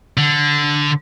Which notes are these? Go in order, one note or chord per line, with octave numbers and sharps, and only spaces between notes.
D3